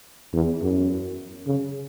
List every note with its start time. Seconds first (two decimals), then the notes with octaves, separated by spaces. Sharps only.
0.33 E2
0.62 F#2
1.46 C#3